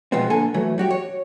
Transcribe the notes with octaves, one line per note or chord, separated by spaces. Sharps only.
B2 E3 F3 G#3 B3 C4
D3 A#3 A4 G#5
E3 F#3 A3
G3 F#4 G4
C#5